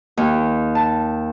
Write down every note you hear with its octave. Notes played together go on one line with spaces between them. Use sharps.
D#2
A5